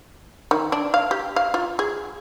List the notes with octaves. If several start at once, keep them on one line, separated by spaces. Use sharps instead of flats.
D#3
D4
F5
G4
F5
F4
G#4